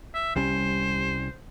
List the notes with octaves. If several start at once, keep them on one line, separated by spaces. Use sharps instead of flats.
E5
C2 G3 C#4 C5